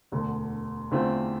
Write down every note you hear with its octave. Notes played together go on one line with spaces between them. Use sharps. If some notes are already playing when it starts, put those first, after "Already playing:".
E1 D2 D3
E2 D3 A3 C4 F4